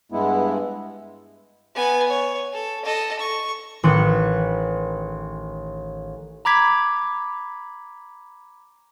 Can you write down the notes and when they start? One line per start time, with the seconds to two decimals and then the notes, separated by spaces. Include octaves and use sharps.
0.12 G2 G#3 B3 E4
1.75 B3 G#5
2.09 C#5
2.53 A4
2.85 A4 D#5
3.20 C#6
3.83 A1 D#3 B4 C6 F#6 C#7
6.45 A#5 B5 D6 G#6 B6